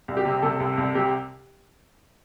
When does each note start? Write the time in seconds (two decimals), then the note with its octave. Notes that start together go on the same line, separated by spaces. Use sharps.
0.08 C2
0.17 G4
0.25 C3
0.43 C3 A4
0.60 C2
0.78 C2
0.95 C3 G4